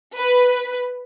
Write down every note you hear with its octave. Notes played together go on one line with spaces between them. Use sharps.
B4